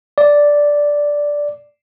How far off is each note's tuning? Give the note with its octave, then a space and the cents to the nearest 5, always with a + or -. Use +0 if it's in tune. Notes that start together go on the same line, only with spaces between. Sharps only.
D5 -5